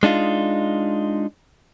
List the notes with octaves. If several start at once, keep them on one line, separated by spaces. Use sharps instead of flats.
G#3 D4 D#4 F4